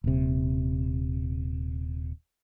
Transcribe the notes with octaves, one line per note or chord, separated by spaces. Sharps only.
D#1 C3